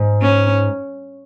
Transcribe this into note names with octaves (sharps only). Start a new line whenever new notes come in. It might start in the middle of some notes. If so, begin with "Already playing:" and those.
Already playing: G#2
C#4